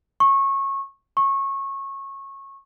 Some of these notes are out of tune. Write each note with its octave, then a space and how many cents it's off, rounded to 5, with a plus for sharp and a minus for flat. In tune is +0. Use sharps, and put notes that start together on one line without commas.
C#6 -20
C#6 -20